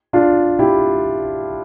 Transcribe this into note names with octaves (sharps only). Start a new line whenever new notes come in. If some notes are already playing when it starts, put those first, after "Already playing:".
D4 F4
E4 G4